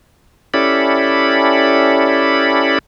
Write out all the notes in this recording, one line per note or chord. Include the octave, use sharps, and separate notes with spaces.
C#4 E4 G4 A4 D5 B5